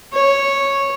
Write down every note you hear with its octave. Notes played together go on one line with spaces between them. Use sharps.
C#5